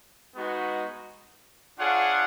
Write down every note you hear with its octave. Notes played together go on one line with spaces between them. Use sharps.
G#3 B3 D#4 F#4
D4 F4 G#4 C#5 F#5